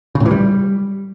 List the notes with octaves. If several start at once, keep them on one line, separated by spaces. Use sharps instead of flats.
C#3
A2
E3
G3